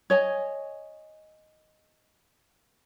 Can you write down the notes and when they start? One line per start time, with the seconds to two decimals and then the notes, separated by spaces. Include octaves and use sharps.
0.10 C#5 D#5 G#5